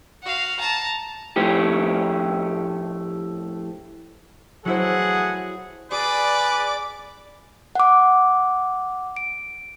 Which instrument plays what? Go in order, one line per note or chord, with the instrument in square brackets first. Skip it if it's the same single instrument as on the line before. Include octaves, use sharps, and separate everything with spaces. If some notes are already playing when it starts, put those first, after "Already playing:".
[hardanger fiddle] F#4 F5
A5 A#5
[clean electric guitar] A2 F3 A3 G4
[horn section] A2 E3 F#5 [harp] F#3 E4 C5 [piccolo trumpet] G#4
[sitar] G#4 [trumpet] B4 [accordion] D5 [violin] D6
[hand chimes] F#5 D6
D7